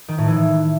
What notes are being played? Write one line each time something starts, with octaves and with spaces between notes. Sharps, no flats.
D#3
A2
E3